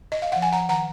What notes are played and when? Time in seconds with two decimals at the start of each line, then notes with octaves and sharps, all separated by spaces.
0.12 D#5
0.22 F5
0.32 F3 F#5
0.42 G#5
0.52 F3 F#5 A#5
0.69 D#3 F#5 A#5